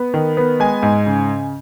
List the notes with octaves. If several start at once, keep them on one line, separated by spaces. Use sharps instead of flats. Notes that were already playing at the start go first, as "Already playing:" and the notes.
Already playing: B3
D#3
B3
G#3 G#5
G#2
C#3